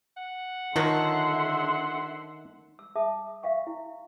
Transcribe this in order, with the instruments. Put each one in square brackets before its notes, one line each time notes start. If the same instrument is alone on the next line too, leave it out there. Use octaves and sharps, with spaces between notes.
[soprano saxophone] F#5
[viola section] D3 E5 C6 [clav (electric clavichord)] D#3 [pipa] F3 F#3
[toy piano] E6
G#4 E5 A5 D#6
E5 F5 G5 C#6
E4